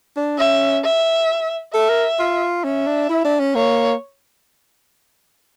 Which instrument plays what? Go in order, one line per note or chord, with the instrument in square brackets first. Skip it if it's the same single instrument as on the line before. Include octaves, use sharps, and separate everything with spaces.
[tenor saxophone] D4
[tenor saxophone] C#4 [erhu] E5
[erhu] E5
[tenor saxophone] A4 [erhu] E5
[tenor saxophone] A#4
F4
[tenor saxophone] C#4 [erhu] E5
[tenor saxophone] D4
E4
D4
C#4
[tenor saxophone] A#3 [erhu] C#5